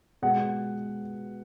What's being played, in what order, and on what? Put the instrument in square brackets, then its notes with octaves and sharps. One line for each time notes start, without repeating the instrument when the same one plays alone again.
[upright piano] B2 G#3 B3 F#5